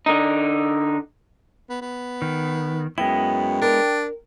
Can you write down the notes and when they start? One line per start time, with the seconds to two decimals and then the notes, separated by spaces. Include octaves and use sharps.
0.06 D3 D#4
1.70 B3
1.81 B3
2.22 D#3
2.98 F#2 G#3 B3 E4 G5
3.62 D4 A#4